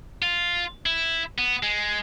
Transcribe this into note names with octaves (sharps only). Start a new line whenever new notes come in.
F4
E4
B3
G#3